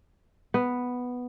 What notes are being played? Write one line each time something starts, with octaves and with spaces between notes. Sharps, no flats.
B3